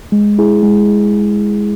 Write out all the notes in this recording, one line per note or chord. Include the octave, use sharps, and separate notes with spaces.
G#3
E4 G#4
G#3